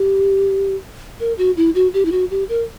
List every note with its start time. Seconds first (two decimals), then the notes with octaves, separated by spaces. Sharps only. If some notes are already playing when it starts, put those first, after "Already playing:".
Already playing: G4
1.20 A#4
1.38 F#4
1.57 E4
1.75 F#4
1.94 G4
2.05 E4
2.12 F#4
2.31 G4
2.49 A#4